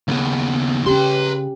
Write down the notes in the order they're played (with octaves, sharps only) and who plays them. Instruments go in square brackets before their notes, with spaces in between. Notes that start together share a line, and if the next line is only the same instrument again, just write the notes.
[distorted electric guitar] D#2 B3 [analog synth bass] C#3
[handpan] C#4 G4 [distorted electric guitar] B4 C6